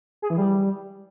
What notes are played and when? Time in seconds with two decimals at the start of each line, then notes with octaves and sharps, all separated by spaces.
0.22 G#4
0.30 E3
0.38 G3